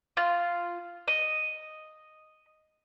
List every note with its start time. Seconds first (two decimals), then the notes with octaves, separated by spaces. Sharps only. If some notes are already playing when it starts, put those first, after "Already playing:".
0.17 F4
1.08 D#5